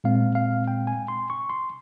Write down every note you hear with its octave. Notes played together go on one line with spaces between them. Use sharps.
A#2 G#3 C4 F5
F5
G5
G#5
C6
C#6
C6